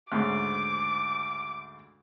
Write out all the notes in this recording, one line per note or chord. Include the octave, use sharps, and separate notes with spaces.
D2 G#2 C#3 D6